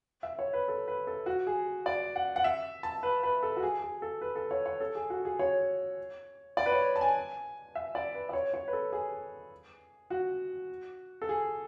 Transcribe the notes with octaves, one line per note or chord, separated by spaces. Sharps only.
E5
C#5
B4
A4
B4
A4
F#4
G#4
D5
F#5
F#5
E5
A5
B4
B4
A4
F#4
G#4
G#4
A4
B4
A4
C#5
C#5
A4
G#4
F#4
G#4
C#5
D5
B4
C#5
A5
G#5
E5
D5
B4
D5
C#5
C#5
B4
A4
G#4
F#4
A4
G#4